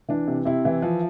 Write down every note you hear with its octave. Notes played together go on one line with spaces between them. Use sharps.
E3 D4
C3
C3 E4
E3
F3